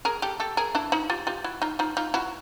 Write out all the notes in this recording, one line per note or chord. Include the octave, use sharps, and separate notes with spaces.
G#4 A#4
G4 A4
G4 A4
G#4 A#4
D4 E4
D#4 F4
F4 G4
F4 G4
E4 F#4
D#4 F4
D#4 F4
D#4 F4
E4 F#4